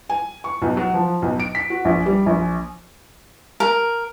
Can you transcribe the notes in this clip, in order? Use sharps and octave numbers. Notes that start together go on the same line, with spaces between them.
G#5
C#6
B1
F#3
F3
B1
D7
B6
F#4
A#1
G3
A#1
A#4